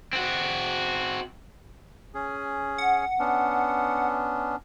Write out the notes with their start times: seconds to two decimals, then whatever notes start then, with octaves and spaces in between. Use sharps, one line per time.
0.13 C4 F#4
2.14 C#4 G#4
2.78 F#5
3.19 B3 C#4 D4